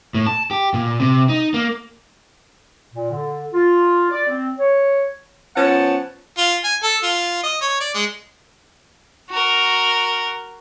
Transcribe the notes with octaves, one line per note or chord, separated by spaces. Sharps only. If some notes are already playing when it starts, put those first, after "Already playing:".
A2
A5
G4
A#2
C3
D#4
A#3
A#2
D3
F4
D5
C4
C#5
F3 B3 C#4 F#5 A5
F4
G#5
A4
F4
D#5
C#5
D5
G#3
F#4 A#4